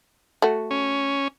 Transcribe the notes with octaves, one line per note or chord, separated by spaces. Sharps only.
A3 F#4
C#4